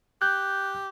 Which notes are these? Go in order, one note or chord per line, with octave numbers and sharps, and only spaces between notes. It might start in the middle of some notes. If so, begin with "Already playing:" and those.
G4 F#6 G6